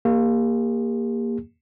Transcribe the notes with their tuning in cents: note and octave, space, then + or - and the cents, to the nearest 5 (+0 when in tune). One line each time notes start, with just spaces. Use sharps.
A#3 +0 G4 +40